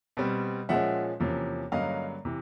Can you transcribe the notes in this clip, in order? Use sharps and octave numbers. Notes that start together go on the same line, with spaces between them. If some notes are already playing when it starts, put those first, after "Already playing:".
B2 G3 C4
A#2 F3 G#3 C#4 E5 F#5
E2 C3 F3 A#3 C#4
G2 D3 F#3 A#3 C#4 D#5 F5
C3 E3